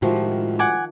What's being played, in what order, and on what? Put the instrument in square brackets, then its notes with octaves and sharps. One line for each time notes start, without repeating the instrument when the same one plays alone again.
[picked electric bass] A2 G#3 [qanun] D#3 F3 [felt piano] E4 F#4 G4
[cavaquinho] F#5 G#5 D6